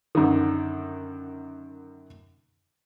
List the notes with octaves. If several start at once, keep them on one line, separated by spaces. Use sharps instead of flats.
F#2 D3 D#3